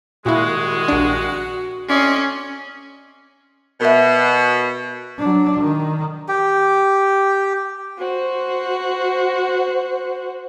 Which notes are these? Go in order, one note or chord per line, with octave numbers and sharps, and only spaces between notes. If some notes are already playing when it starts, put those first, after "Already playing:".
C2 A#2 D#3 G#3 E4 F#4
A#1 D4
A2 C4 C#4 D5 D#5 C6
B2 A#4 E5
F#3 D4
D#3
G4
F#4 C5